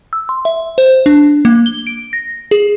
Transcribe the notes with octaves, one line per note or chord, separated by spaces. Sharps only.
E6
C6
E5
C5
D4
A#3
G7
D7
A#6
G#4